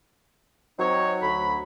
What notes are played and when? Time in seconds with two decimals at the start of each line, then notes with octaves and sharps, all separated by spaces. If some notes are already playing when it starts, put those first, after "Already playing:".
0.79 F#3 C4 D#4 C#5
1.22 D2 B5